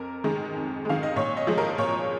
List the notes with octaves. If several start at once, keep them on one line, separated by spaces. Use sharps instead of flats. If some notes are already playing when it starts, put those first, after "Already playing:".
Already playing: F2 A#4
D#3 G#3
F2
D#3 G#3 F5
D#5
A#2 C#5
D#5
F3 G#3
A#4
A#2 C#5